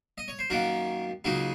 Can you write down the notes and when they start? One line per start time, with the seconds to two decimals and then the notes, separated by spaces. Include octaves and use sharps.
0.18 D#5
0.28 C#5
0.39 C5
0.50 F#2 D#3 A#3 F#4 A#4
1.24 C#2 C#3 F#3 A#3 D#4 F#4